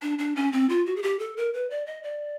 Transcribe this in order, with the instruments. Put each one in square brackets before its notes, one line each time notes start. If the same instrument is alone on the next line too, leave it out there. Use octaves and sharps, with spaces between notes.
[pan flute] D4
D4
C#4
C4
F4
F#4
G#4
G4
A4
A#4
B4
D5
D#5
D5